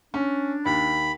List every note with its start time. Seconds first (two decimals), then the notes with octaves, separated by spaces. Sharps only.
0.14 C#4 D4
0.66 D#2 B5